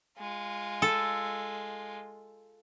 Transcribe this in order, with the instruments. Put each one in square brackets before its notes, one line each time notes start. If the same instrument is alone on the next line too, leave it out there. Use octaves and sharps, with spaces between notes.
[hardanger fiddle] G#3 F4
[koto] A4